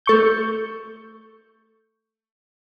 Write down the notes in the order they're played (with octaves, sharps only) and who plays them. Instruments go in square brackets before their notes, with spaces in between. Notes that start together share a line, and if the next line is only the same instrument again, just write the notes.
[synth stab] A3 C#6 G6